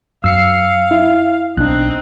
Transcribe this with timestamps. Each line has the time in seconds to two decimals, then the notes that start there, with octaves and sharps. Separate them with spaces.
0.24 F#2 F5 E6 C7 C#7
0.91 E4
1.57 B1 C4 D4 D#4 F#6